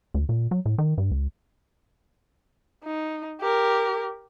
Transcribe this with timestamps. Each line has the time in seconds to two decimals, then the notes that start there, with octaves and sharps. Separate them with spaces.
0.14 D2
0.29 A#2
0.51 F#3
0.66 A2
0.78 D#3
0.98 G2
1.11 C#2
2.84 D#4
3.41 G4 A#4